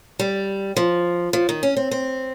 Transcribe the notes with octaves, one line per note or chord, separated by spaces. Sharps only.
G3
F3
F3
D#3
C#4
C4
C4